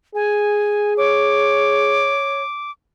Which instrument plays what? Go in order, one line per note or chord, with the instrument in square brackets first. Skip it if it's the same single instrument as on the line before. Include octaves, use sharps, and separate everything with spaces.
[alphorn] G#4 [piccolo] G#5
[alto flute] C#5 [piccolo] D6